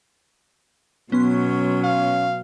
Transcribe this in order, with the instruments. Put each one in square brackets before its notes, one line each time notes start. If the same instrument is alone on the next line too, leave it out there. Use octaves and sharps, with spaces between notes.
[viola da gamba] B2 F#3 [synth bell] B3 C6 [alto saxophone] C#4
[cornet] F5